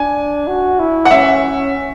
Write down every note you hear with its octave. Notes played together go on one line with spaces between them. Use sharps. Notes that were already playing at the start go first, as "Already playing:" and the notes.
Already playing: D4 G#5
F#4
E4
F#5
C#4 E5